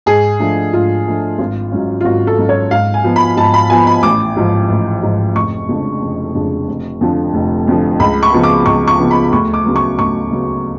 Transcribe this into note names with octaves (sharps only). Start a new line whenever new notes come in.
G#2 G#4
F3 A3 D4
G#2 F4
F3 A3 D4
G#1
G#2 F#3 C#4
F4
G#1 F#4
A4
G#2 F#3 C#4
C#5
G#2 F5
G#5
F3 B3
B5
G#2 A5
B5
F3 B3 G#5
B5
A1 D6
G#2 F3
A1
G#2 F3
F1 C#6
F2 C#3 G#3 D4
F1
F2 C#3 G#3 D4
F1
F2 D3 F3
F1
F2 D3 F3
C#2 B5
C#6
C#3 F3 B3
D6
C#2 C#6
C#6
C#3 F3 B3
B5
D2 C#6
D6
C#3 F#3 B3
C#6
D2 C#6
C#3 F#3 B3